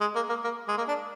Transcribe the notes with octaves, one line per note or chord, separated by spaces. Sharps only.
G#3
A#3
A#3
A#3
G#3
A#3
D4